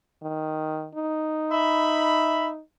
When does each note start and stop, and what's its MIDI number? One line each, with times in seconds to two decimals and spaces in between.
0.23 0.88 51
0.95 2.60 63
1.51 2.48 76
1.51 2.48 83